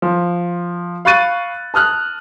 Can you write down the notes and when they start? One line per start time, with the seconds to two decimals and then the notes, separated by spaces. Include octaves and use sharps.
0.02 F3
1.05 F5 B5 C#6 F#6 A6 D#7
1.74 A5 D#6 F6 F#6